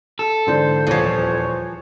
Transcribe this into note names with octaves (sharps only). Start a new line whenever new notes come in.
A4
G#2 D3 E3 C5
D#1 E2 E3 F3 C5 C#5